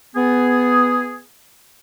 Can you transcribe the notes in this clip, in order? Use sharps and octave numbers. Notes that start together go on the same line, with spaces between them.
B3 G#4